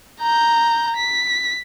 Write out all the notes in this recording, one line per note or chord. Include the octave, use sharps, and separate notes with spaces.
A#5 G6
B6